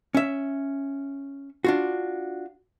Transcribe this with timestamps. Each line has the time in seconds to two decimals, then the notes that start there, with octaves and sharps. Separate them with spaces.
0.15 C#4 E5
1.64 D4 F4 F#4